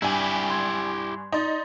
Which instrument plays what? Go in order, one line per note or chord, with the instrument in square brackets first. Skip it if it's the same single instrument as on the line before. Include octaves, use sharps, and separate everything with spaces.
[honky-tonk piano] G2 G#5 [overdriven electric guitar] E4 G4
[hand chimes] C6 G#6
[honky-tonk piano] D#4 [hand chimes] D5 C6 A6